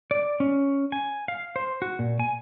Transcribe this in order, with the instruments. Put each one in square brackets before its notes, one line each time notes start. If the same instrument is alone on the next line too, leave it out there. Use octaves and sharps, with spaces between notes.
[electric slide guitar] D5
C#4
G#5
F5
C5
F#4
A#2
G#5